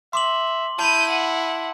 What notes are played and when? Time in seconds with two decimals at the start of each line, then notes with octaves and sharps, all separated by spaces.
0.13 E5 C6 D6 F#7
0.79 E4 A5 B5 G6 D#7
1.10 F#5